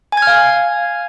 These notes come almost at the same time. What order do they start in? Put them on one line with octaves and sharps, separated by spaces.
G#5 G#6 F6 F5